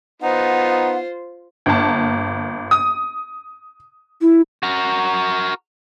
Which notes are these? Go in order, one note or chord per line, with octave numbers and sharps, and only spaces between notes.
B3 D#4 F4 C5 F#5
G1 A#3 A5
D#6
E4
F#4 A#4